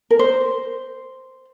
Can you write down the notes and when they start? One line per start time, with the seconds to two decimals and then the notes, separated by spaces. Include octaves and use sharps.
0.11 A#4
0.19 C5